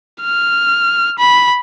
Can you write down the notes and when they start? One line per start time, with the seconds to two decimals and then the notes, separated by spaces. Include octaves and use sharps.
0.21 F6
1.19 B5